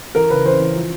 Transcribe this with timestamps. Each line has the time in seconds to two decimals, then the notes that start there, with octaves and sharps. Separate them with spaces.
0.15 E3 A#4
0.30 C#3 B4
0.44 E3 C5
0.60 E3
0.76 F3